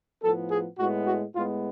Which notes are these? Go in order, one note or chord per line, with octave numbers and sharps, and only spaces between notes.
A2 F3 B3 A4
G#4
A2 G#3 B3 F#4
F#4
A2 G#3 B3 F4